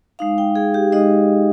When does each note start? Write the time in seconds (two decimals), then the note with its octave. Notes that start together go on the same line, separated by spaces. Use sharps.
0.19 G#3 D#4 F5
0.38 G5
0.56 G#4
0.74 G4
0.92 G#3 D#4 D#5